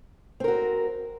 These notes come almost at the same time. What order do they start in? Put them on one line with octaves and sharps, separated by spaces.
C4 A#4 F#4